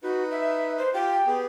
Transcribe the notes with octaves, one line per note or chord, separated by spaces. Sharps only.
D#4 F#4 B4
E5
C5
F4 G4 G5
B3 G4 G#4